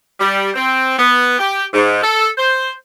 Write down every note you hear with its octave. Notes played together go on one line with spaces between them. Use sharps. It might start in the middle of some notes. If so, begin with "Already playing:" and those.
G3
C4
B3
G4
G#2
A4
C5